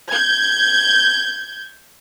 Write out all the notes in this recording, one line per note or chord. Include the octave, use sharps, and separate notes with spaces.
G6 G#6